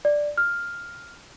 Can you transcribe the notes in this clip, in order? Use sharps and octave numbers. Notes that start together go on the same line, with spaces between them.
D5
F6